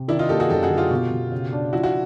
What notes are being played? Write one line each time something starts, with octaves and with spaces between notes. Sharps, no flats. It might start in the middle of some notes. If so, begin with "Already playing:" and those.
Already playing: C3
D#3 D4 E4
D#4 F4
A#3 G4 A4
F#4 G#4
F#2 G4 A4
F#4 G#4
D3
F4 G4
B2
B2
C#3
D4
F3 E4 F#4
E4 F#4